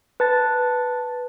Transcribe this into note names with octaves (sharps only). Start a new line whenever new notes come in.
B4 A5 A6